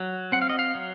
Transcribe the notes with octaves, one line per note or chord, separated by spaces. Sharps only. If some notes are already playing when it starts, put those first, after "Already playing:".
Already playing: F#3
C4 F#5
F5
D#5
F5
F#3